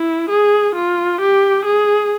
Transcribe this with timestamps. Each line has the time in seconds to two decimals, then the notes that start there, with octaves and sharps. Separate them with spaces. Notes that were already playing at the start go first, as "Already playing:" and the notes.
Already playing: E4
0.30 G#4
0.75 F4
1.21 G4
1.65 G#4